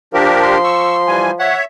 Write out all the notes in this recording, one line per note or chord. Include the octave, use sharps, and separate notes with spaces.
F3 D4 G4 A#4
C6
C#6 E6
E3 G3 G#5
C#5 E5 F#5